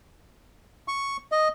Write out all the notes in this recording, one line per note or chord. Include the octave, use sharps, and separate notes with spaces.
C#6
D#5